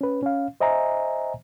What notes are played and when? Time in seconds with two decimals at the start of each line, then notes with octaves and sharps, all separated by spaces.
0.01 C#4 B4
0.23 C#4 F5
0.61 C5 D#5 E5 G#5 A#5